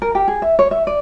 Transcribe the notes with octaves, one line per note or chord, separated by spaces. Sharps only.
A#4
G4
G#4
E5
C#5
E5
D5